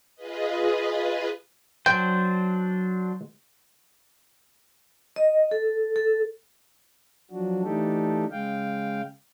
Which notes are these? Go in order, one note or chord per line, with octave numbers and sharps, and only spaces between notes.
F4 G#4 B4 D#5
F#3 D4 C5 G5
D#5
A4
A4
F3 F#3 D4 F#4
E3 A3 D4 D#4 G4 A4
C#3 G#3 F5 G5